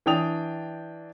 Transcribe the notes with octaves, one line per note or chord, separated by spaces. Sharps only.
E3 D4 D5 G5 D#6 F7